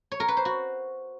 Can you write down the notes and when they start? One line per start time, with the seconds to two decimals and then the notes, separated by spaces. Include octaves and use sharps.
0.12 C#5
0.20 A#4
0.28 B4
0.37 C5
0.45 F#4